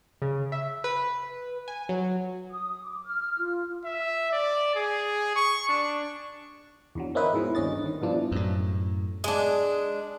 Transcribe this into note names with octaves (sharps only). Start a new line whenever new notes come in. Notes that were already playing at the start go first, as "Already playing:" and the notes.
C#3
E5
B4
G#5
F#3
D#6
D6
F6
F4
E5
D5
G#4
C#6
D4
E2 D3 F#3
A#3 C4 C#4 D#4 E4 B4
G#2 B2 E3
G1 D#2 D3 C#4 D#5 A6
D#3
G2 B2 E3 F3 D4
F#2 A2
G#3 D4